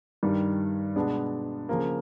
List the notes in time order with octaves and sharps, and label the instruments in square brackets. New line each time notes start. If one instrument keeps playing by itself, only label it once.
[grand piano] G2 D#3 G3
B2 G#3 B3 D4
C#3 F3 A#3